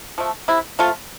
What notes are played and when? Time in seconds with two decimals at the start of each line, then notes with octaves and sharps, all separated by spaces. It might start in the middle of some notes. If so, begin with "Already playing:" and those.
0.18 F3 A3
0.48 C3 E4
0.79 F3 A3 F4